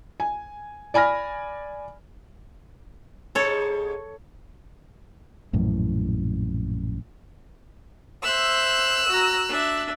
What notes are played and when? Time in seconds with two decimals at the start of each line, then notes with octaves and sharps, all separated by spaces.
0.20 G#5
0.94 D5 G#5 B5 F6 A#6
3.35 G#2 C3 G#3 A4 C#5
5.53 A#1 F#2 A2 E3
8.23 C5 E5 E6 F#6
9.08 F#4 A#5
9.49 D4 E5